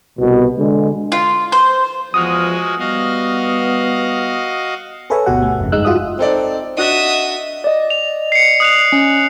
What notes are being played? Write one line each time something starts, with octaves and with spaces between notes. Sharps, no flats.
C2 B2
D3 G#3
F4
C5
E2 F3 G#3 F#4 D#6 F6
G3 B3 F#4 D#5 F5
G#4 A4 B4 C#5 E5 G#5
G1 D2 B2 F#4 G4 F#5
A3
G1 F2 C#3
G2 G#3 D#4 E6 F#6
F4 F#4 G#4 E5 D#6
C4 D#4 A4 D5
D4 F#4 D#5 E5 F#5 D#6
D5 D#5
F7
C7 C#7
D#6 F#6 F7
C#4